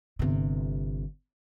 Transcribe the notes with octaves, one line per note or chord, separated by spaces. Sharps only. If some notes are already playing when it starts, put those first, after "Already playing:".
G1 C3